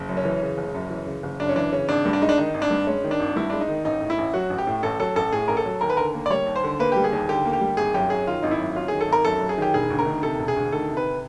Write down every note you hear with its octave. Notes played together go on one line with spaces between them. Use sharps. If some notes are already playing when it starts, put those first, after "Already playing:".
Already playing: F#1
F#2
C#4
E3
C#3
F#1
F#2
E3
C#3
F#1
F#2 D4
C#4
E3 D4
C#3 C#4
G#1 D4
G2
D4
G#3 D#4
D4
D#3 D#4
G#1
D4
G2
G#3 C#4
D#3
D4
G#1
G2 E4
G#3 D4
D#4
D#3
A1 D#4
A2
E4
A1
F#3 F#4
A1
G4
A2
A1 A4
F#3 A4
A1 A4
A2 G#4
A1 A#4
A4
F#3
D#2 A#4
B4
D3 A#4
A#3
D5
G3 C#5
D#2
C5
D3
A#3 B4
G3 G4
G#4
D#2
D3 G4
A#3
G4
G3
G#1 G#4
F#2 G4
F#3 G#4
D#3 F4
G#1 D#4
E4
F#2
F#3 F4
D#3 G#4
A4
G#1 A#4
F#2 A4
F#3
G#4
D#3 G4
E1 G#4
D2
A#4
D#3
C3 A4
E1
G#4
D2
D#3 A4
C3
B4